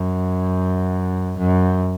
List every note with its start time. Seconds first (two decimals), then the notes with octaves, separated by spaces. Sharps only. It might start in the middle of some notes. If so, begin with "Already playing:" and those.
Already playing: F#2
1.38 F#2